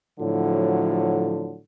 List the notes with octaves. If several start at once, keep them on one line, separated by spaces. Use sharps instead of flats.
A2 D3 F3 F#3